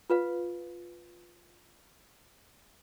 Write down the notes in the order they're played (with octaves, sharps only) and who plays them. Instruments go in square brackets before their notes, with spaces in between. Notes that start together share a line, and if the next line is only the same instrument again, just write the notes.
[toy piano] F4 B4 F5